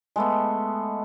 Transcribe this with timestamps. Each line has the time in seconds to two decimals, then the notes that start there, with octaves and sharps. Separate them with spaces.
0.16 G#3 A3 B3